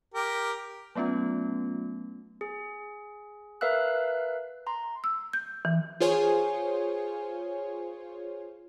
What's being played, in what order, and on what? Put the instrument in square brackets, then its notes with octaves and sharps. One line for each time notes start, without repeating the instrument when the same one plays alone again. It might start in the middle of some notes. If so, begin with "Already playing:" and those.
[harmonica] G4 A#4
[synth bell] F#3 A3 B3 C#4 F4
[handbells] G#4
A#4 B4 E5 F5 E6 F#6
A#5 C6
[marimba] E6
G6
E3
[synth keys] F4 G#4 C5 C#5 G#5